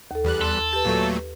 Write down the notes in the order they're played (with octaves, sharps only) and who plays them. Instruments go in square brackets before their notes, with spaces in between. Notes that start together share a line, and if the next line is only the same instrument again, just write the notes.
[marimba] D#2 A4
[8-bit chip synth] E2 G3 F#6
[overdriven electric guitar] A4 [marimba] C6
[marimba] G4 B4 [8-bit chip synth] A5
[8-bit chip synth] A#2 F#3 A3